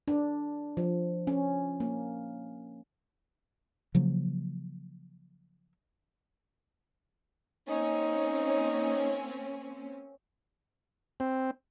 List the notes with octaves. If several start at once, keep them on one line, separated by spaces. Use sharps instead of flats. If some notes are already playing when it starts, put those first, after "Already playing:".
D4
F3
C#4
A#3
C#3 F3 F#3 A#3
A#3 C4 C#4 D#4
C4